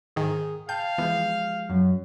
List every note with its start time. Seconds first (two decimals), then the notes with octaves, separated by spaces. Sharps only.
0.16 G#2 D#3 G#4 D#6
0.69 F5 G5 A5 G6
0.98 E3 F3 G#3 B3 G6
1.69 F#2